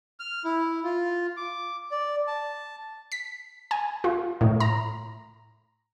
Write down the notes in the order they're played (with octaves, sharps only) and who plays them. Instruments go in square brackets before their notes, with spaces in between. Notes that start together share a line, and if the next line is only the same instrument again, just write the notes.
[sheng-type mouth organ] F6
E4
F4
D6
D5
A5
[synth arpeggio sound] B6
G#5
F4
A2
A#5